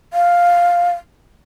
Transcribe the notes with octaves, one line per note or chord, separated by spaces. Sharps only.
F5